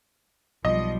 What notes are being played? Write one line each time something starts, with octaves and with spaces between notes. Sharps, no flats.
B1 F3 G3 D#5